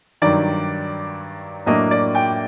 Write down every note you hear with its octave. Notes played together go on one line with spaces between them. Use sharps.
G2 D#3 F#3 D5
A2 F#3 A#3 D4 D#5
D5
G5